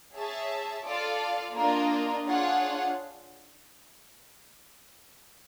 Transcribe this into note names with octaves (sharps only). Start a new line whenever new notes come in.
G#4 C#5 E5 A5
F4 A4 D5 F5
A#3 D4 F4 A#4 D#5
D4 F4 G#4 C#5 F#5